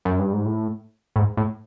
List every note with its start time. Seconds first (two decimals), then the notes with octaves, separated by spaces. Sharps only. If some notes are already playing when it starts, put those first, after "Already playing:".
0.05 F#2
0.19 G2
0.33 G#2
0.46 A2
1.16 A2
1.19 G#2
1.37 A2